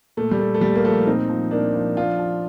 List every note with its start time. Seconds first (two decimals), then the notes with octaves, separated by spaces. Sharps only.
0.17 A#2 A3
0.31 G3
0.39 A#2 A3
0.54 A3
0.61 A#2 G3
0.75 A#3
0.85 F3 A3
1.07 A#2 C4 D#4
1.30 F3
1.51 A#2 A#3 D4
1.75 F3
1.97 F3 D4 F4
2.19 F3